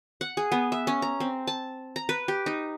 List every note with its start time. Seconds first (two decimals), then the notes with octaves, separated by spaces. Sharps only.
0.21 F#5
0.37 G#4
0.52 B3
0.72 E5
0.87 C#4
1.02 A#5
1.20 C4
1.47 A5
1.96 A#5
2.09 B4
2.28 G4
2.46 D#4